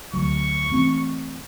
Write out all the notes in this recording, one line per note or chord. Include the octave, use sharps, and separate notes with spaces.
D2 F#3 C#6
E3 A3 C4